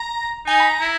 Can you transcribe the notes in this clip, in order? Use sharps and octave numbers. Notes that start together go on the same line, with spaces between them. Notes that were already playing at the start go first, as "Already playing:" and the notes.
Already playing: A#5
D#4 G#5
B5
A#5
E4